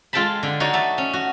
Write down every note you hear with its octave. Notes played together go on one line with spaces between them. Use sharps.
G#3 F4 A4 G5 A5 B5
D3
D#4 F#4 C#5 D5
A3 A4
C#4
F#4